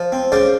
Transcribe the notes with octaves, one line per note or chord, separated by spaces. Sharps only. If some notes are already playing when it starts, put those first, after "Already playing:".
Already playing: F3
C4
C#3 C5 D5